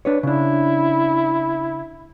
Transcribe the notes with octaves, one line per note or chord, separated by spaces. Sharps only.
D4 B4 C#5
C#3 D4 E4